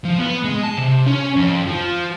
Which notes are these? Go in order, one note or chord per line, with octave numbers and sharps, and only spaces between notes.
F3
B3
G#3
A5
C3
C#4
F2
F3